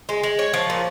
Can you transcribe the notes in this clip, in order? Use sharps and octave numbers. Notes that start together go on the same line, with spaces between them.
G#3
G#3
C#5
F3
A#2